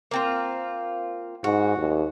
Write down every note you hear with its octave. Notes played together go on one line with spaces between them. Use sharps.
A#3 C4 F4
G#2 F#4
D#2